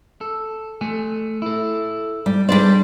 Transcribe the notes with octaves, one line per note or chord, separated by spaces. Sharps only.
A4
A3 A4 G#5
E4 A4
G3
G3 D4 G#4 B4 C5 D5